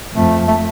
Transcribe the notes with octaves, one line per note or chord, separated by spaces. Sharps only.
F2 A3
A3